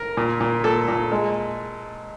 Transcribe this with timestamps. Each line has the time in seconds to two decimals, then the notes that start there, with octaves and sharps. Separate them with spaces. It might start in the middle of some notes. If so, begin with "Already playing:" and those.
Already playing: A#4
0.17 A#2
0.41 A#2
0.64 A#2 A4
0.88 A#2
1.12 G#3